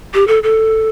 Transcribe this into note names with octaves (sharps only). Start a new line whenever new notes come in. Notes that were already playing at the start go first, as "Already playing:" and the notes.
G4
A4
A4